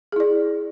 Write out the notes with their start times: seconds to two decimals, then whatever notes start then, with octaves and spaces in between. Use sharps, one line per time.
0.12 G#4
0.16 E4
0.20 D5